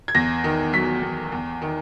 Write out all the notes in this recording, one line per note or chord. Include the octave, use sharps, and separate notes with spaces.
G#6
E2 A#6
D#3
F#3 B6
E2
E2
D#3